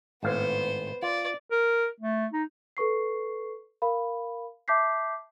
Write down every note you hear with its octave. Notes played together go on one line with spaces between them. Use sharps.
G#1 A2 B3 C5 F5
F4 D5
A#4
A3
D#4
A4 B4 C#6 C7
A#4 F5 B5
E5 A5 D6 G6 B6 C7